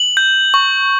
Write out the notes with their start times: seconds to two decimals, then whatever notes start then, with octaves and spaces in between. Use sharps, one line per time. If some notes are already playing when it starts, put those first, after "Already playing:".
Already playing: F#7
0.17 G6
0.54 C#6